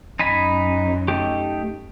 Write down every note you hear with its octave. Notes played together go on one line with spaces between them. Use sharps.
F#2 D#4 G#5 B5
A3 D#4 G4